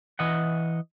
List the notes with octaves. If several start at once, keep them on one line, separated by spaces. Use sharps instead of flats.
E3 D#5 F#5